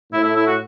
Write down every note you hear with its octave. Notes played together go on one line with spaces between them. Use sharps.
A2 E4
E4
E4
F#4